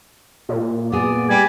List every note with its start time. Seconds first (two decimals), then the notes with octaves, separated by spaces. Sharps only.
0.49 A#2
0.92 B3 G#4 D5
1.29 G3 G#5